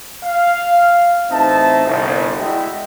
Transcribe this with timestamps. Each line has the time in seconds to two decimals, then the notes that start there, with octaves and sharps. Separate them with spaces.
0.24 F5
1.30 A1 C4 D#4 E5 A5
1.86 G1 C2
2.40 G#3 E4 F#4 D#5 E5 G5